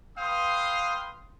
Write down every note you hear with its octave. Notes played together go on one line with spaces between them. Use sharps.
B4 F5 G5 C6 D#6